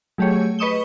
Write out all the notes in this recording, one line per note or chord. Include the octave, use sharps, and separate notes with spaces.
F#3 A3 G4 G#4 C#5
B4 D#5 C#6 D#6 E7 G7